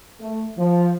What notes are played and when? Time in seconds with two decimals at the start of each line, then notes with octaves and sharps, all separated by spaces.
0.21 A3
0.58 F3